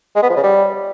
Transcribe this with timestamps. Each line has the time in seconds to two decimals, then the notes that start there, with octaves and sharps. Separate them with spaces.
0.16 G#3
0.23 B3
0.30 F3
0.37 C#3
0.44 G3